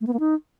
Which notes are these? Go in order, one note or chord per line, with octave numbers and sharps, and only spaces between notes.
A3
B3
A#3
D#4